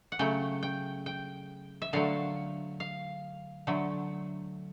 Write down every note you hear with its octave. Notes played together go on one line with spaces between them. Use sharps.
F#5
C#3 F#3 A3 G5
G5
G5
E5
D3 F#3 A3 F5
F5
D3 F#3 A3